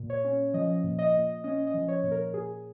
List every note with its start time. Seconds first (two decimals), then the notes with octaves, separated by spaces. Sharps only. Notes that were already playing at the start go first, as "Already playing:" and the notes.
Already playing: A#2
0.10 C#5
0.24 C#4
0.54 F3 D#5
0.84 A#2
0.99 D#5
1.14 A#2
1.44 C#4 D#5
1.67 D#5
1.74 F3
1.88 C#5
2.03 A#2
2.11 A#4
2.34 A#2 G#4